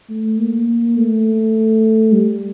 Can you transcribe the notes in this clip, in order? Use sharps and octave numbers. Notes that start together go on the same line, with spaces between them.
A3
A#3
A3
G3